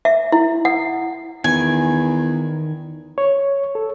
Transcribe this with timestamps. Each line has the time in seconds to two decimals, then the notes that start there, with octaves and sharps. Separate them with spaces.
0.05 E5
0.32 E4
0.65 F#5
1.44 E2 D#3 G#5
3.18 C#5
3.75 A4